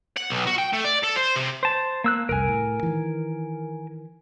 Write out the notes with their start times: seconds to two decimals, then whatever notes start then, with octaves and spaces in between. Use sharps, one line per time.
0.17 F#5
0.30 B1
0.47 F#4
0.58 G5
0.73 A3
0.84 D5
1.03 A4
1.16 C5
1.36 C3
1.63 C5 A5
2.04 A#3 E6 F#6
2.29 F1 C2 F2 A#4 G#5
2.48 A2
2.83 D#3 E3